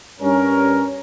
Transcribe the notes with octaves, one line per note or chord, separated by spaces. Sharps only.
G2 C#4 A#4